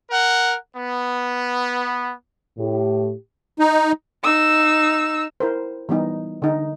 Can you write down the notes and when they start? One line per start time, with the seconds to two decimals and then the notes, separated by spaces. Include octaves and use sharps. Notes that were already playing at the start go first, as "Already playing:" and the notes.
0.11 A#4 F#5
0.76 B3
2.58 A2 G4
3.59 D#4
4.24 D#4 E6
5.40 E4 A#4 C5
5.89 E3 G3 B3 D#4
6.42 D3 D#4